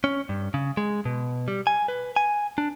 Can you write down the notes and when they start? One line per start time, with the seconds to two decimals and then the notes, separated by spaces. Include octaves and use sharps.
0.04 C#4
0.29 G2
0.54 C#3
0.77 G#3
1.05 B2
1.48 G3
1.67 G#5
1.88 B4
2.16 G#5
2.58 D4